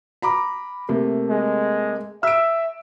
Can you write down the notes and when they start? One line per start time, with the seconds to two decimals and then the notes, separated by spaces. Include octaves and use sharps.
0.22 A#5 B5 D6
0.89 C3 A3 A#3
1.29 G#3
2.23 E5 E6 D7